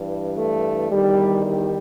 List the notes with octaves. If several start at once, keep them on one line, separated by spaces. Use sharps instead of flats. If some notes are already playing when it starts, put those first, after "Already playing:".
Already playing: G2 E3
A3
E2 D#3 G3
G3